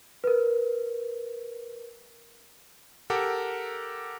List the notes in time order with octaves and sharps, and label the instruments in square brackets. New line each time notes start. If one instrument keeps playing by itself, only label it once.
[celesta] A#4 B4
[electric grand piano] G4 A4 A#4 F#5 D6